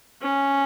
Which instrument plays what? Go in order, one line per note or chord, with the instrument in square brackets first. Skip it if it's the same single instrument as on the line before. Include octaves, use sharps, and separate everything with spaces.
[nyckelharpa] C#4